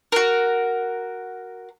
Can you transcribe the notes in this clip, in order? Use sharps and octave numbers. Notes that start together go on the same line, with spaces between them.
F#4 A#4